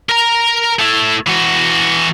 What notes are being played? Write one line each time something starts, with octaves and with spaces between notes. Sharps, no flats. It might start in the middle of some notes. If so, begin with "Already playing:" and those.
A#4 A#5
A3 E4
E3 F#4